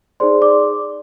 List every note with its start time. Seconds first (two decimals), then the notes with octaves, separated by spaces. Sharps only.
0.20 D#4 G#4 C5 D5 C6
0.42 D5 D6